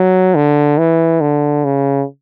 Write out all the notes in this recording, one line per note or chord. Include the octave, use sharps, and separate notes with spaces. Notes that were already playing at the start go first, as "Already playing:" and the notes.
Already playing: F#3
D3
E3
D3
C#3